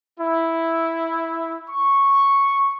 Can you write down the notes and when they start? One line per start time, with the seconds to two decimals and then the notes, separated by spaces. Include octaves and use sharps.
0.20 E4
1.70 C#6